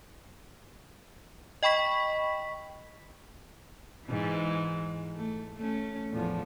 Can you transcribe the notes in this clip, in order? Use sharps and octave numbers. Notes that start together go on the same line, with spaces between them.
D#5 G5 B5 C#6 B6
G#2 E3
A3
A3 C#4
E2 A2 F3